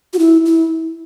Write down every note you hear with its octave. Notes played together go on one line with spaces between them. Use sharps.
F#4
E4
E4